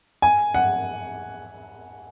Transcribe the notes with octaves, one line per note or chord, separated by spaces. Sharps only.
G#5
F#5